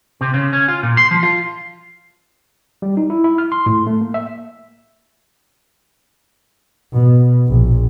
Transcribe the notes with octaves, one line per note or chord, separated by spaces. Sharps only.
C3
C#3
C#4
F4
A#2
C6
F3
F4
G3
D#4
E4
E4
F6
C6
A2
A3
A#3
E5
B2
A#1